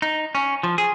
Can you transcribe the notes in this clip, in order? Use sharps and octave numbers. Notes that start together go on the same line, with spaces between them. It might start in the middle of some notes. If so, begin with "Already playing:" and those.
D#4
C#4
F3
G#4